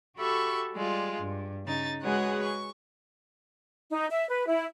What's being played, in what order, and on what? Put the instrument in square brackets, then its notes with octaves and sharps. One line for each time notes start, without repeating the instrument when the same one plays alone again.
[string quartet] F#4 G4 A4 E5 B5 C#6
G3 G#3 F4
G2
C#3 D#4 A6
G#3 F#4 G#4 B4 C#5 F#5
C#6
[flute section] D#4
E5
B4
E4